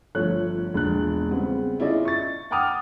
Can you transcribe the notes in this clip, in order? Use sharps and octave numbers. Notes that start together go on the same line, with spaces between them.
G1 F3 A3 C#5 F#6
E1 A#1 B2 D4 F#6
C#3 G3 B3 C4
C#4 E4 F4 G#4 D5 D#5
C#6 A6
F#5 G5 A5 D6 D#6 F6